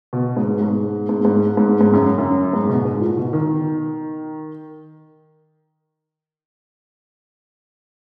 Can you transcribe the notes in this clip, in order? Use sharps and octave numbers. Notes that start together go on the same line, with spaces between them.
B2
G#2
G#2
G#2
G#2
G#2
G#2
F#2
F#2
G#2
B2
G#2
A#2
B2
D#3